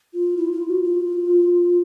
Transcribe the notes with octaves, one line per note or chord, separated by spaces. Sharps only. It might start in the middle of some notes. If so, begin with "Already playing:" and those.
F4
E4
F4
F#4
F4